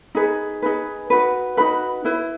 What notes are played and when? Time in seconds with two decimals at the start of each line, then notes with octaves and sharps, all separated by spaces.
0.15 D#4 G#4 B4
0.62 D#4 G#4 B4
1.10 D#4 F#4 B4
1.57 D#4 F#4 B4 B5
2.05 E4 B4